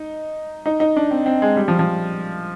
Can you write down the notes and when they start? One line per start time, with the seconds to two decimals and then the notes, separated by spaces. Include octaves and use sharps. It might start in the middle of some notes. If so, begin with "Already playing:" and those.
Already playing: D#4
0.66 D#4
0.80 D#4
0.96 D4
1.11 C4
1.26 C4
1.42 G#3
1.56 G3
1.68 F3
1.79 F3